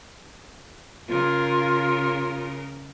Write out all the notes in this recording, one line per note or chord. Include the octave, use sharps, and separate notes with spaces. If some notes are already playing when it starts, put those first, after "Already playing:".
C#3 F4 A#4